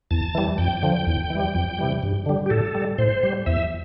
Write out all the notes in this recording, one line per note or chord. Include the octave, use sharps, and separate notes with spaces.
E2 A5
E3 G3
F2 G5
D3 F3
E2
E3
G3
F2
C3 E3 G3
G2
D3 G3
G4
A2 A4
G3
A2 C5
G3
E2 E5